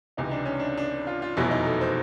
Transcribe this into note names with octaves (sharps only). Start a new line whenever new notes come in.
C#2 C3 E3 D#4
D4
C#4
D4
D4
F4
F4
F1 E2 B2 F#3 E4
D#4
A4
C5